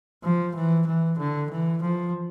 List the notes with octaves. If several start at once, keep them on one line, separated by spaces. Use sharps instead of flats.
F3
E3
E3
D3
E3
F3